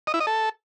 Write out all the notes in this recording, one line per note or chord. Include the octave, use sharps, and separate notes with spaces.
D#5
E4
D#5
A4